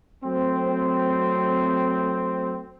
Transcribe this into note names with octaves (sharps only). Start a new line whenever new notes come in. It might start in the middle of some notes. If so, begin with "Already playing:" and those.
F#3 A3 C4